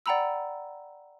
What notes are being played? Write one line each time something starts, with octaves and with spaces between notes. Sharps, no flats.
D5 F#5 G5 A#5 B5 E6